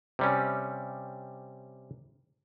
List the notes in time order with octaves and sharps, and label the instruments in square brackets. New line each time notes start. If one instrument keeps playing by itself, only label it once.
[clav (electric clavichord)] C3 G3 C#4